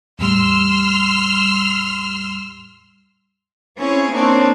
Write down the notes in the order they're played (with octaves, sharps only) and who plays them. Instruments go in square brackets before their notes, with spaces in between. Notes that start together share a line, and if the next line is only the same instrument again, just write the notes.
[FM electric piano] E2 A2 G3 [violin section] C6 E6 F6
[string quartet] C4 C#4 E4 G#4 C#5
A#3 C4 D4 D#4 C#5